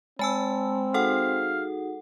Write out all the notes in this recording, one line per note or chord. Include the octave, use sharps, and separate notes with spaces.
G#3 C4 G#5 A5 E6
D#4 F#4 G#4 A4 F5 F#5